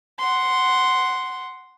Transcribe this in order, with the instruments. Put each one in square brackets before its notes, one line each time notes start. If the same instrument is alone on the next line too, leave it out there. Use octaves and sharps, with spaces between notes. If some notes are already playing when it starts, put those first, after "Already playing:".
[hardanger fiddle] F#5 C6